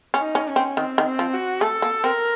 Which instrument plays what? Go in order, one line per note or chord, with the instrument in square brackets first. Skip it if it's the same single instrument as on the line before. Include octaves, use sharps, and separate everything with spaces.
[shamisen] C#4
[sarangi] D#4
[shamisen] C#4
[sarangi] C#4
[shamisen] C4
[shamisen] D#3 [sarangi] C4
[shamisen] D#3
[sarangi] C4
[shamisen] F3
[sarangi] F#4
[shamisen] A3 [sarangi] A4
[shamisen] A#3
[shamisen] C4 [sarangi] A#4